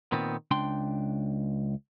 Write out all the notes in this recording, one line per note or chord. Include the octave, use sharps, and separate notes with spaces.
A#2 D#3 B3 C4
C#2 D4 G5 C6